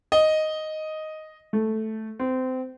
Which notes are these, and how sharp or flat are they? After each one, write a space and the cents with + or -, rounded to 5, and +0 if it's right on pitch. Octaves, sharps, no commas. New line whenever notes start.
D#5 +0
A3 -5
C4 -25